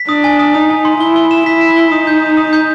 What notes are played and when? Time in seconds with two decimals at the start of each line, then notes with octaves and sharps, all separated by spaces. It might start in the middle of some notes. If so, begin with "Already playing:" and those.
Already playing: B6
0.09 D4 D#6
0.24 G#5
0.39 D#6
0.54 D#4 D#6
0.70 G#5
0.85 C6
1.00 E4 G7
1.16 G7
1.31 E7
1.46 E4 B6
1.61 E7
1.76 G7
1.91 D#4 D#6
2.07 G6
2.22 D#6
2.37 D#6
2.53 G6